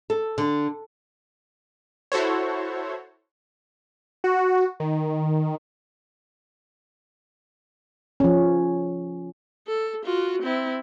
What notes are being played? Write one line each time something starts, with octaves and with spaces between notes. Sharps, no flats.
A4
D3
E4 F#4 A4 C5 C#5
F#4
D#3
F3 C#4
A4
F4 F#4
C4 E4